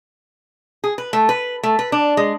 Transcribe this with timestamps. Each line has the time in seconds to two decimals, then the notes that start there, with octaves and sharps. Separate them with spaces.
0.84 G#4
0.98 B4
1.13 A3
1.29 B4
1.63 A3
1.79 B4
1.92 D4
2.17 G#3